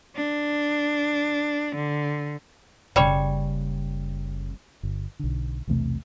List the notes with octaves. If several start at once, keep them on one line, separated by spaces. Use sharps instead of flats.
D4
D3
F#1 C#3 G3 C#5
G1
B1 D3
B1 E2 C3 A3